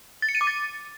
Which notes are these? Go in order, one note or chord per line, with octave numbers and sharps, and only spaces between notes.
A6
C#7
D#7
D6
A6